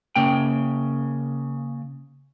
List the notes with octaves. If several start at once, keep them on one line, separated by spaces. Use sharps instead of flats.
C#3 A#3 G5